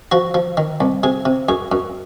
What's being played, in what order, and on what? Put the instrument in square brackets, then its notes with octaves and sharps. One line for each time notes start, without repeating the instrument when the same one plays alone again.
[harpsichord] F3 F#4
F3
D#3
C2
C3 G#4
C3
F#2 G#4
F#2